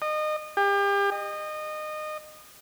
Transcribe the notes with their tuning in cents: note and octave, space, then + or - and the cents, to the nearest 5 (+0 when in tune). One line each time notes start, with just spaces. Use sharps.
D#5 -30
G4 +35
D#5 -25